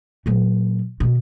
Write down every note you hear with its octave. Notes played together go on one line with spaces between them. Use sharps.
A#2 F#3
B2 D#3